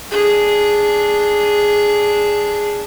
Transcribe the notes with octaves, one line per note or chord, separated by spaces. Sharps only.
D4 G#4